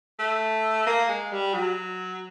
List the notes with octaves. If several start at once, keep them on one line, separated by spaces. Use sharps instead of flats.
A3
A#3
G#3
G3
F#3